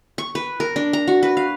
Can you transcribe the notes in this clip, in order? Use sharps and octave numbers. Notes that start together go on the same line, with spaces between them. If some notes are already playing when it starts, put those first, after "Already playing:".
C#6
B4
A#4
D4
A#5
F#4
B4
F5